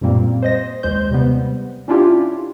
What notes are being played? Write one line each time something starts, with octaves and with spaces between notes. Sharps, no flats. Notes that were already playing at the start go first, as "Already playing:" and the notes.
F#2 A#2 G3 A#3 C4
C5 D#5 A#6
D#2 G#3 C5 G6
C3 G3 B3
C#4 D4 E4 F4 G4